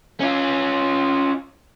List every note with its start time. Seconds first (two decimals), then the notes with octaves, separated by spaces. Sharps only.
0.21 C#4 F4